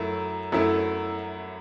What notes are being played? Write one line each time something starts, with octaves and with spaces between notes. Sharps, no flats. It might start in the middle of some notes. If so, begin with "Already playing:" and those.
Already playing: F#2 F#3 A3 E4
F#2 F#3 A3 E4